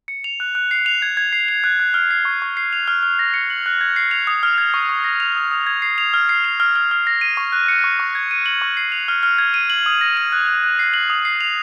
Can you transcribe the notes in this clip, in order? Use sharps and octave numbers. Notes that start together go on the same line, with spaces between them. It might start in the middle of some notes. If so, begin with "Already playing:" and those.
C#7
F7
F#6
F#6
C7
F7
G#6
G#6
C7
F7
F#6
F#6
F6
C7
C#6
C#6
C7
F7
F6
F6
A#6
C#7
F#7
F#6
G#6
C7
F7
D#6
F6
G#6
C#6
C#6
A#6
F7
D#6
D#6
G#6
C7
F7
F6
C7
F7
F6
F6
F6
A#6
D#7
C#6
F#6
C#7
C#6
C#6
G#6
D#7
F#7
C#6
C7
F7
F6
F6
G#6
D#7
F#7
D#6
A#6
D#7
F#6
F#6
F#6
C7
F#7
D#6
C7
F7